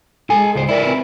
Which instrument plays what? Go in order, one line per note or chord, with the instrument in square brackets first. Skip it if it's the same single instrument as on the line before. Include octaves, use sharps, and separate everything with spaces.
[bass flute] G#3 [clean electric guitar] A4 G#5
[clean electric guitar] C#2 C5
[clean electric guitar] E4 A#4 B4 [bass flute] D5
[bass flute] C4